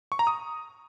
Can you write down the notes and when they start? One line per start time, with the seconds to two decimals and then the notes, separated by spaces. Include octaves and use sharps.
0.12 C#6
0.19 A#5
0.27 D#6